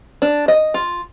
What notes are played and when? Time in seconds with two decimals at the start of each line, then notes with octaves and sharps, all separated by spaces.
0.22 D4
0.48 D#5
0.74 F4